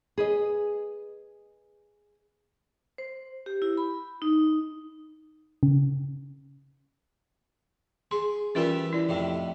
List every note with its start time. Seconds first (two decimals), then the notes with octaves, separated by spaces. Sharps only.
0.18 G#4 B4 D#5
2.98 C5
3.46 G4
3.62 E4
3.78 B5
4.22 D#4
5.63 C#3
8.11 G#4 C6
8.55 E3 G3 C#4 F4 A#4 E5
8.93 E4 D5
9.09 F2 A2 C3